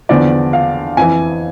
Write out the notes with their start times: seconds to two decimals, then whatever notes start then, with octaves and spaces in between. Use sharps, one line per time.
0.09 E2 D3 F3 D5
0.53 F5
0.97 F2 E3 G#5